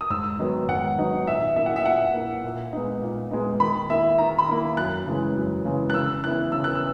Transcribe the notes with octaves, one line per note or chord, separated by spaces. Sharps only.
D#6
G#2 E6
D#3 F#3 B3 D#4
G#2 F#5
D#3 F#3 B3 D#4
A#2 E5
A#3 E4 E5
F#5
E5
A#2 F#5
A#3 E4
A#2
G#3 B3 D#4
A#2
G#3 B3 D#4
D#3 B5
A#3 E4 E5
D#3 A#5
B5
A#3 E4
F#2 F#6
C#3 E3 G#3
F#2
C#3 E3 G#3
F#6
C#3 E6
E3 B3 E4 F#6
C#3 E6
F#6
E6